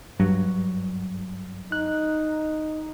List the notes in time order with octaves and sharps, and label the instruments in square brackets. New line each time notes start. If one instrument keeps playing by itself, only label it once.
[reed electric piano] G2 [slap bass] F#3
[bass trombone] D#4 [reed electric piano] F#6